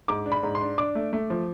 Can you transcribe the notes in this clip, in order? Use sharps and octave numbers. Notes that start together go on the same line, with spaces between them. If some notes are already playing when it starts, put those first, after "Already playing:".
G#2 D6
D4
B5
G#2
C6
D4
D4 D6
A3
A3
F3